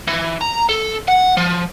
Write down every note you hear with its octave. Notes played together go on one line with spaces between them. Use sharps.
E3
A#5
A4
F#5
F3